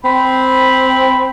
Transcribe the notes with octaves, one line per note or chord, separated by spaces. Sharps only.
C4 B5